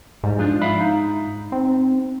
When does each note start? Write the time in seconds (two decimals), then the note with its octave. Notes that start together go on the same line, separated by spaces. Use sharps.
0.24 G#2 G3
0.39 F3 D4 F4
0.62 E5 F5 B5
0.81 D#4
1.52 C4